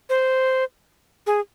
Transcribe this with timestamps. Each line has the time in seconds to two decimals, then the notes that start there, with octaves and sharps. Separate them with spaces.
0.09 C5
1.27 G#4